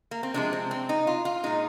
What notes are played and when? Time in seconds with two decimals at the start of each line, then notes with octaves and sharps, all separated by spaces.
0.11 A#3
0.23 C4
0.34 C3 F3 G#3 D4
0.53 C4
0.71 C4
0.89 D#4
1.07 F4
1.25 F4
1.43 A#2 G#3 D#4